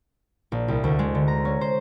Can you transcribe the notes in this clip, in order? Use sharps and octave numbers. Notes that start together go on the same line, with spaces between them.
A#1
C2
D2
G#3
D3
A#5
C#4
C5